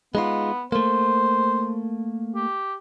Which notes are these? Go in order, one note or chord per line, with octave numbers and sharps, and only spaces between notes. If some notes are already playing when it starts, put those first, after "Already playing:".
G#3 B3 D#4 F4
A3 A#3 C5
G4